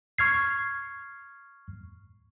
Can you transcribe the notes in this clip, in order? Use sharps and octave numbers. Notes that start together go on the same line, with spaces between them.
C#6 F6 G#6 C7